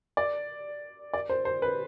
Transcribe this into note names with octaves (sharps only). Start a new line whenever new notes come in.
D5
D5
C5
C5
B4